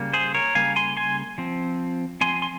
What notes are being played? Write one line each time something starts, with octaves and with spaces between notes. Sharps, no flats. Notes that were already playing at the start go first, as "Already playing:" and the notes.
Already playing: C#3 G3 A#3
G#4 C5
A#4 C#5
C#3 G3 A#3 F5 G#5
G#5 C6
G#5 C6
F3 C4
F3 C4 G#5 C6
C6